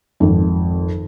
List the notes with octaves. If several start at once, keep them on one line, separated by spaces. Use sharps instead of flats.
G#1 F2